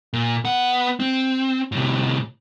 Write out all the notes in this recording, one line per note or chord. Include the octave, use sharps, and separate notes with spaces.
A#2
B3 F#5
C4
A2 C3